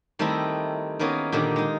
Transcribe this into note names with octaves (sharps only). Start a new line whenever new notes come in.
D#3 G3 A3 C4 D#4 E4
D#3 A#3 B3 C#4 G#4
A#2 D3 D#3 G3
G#3 D#4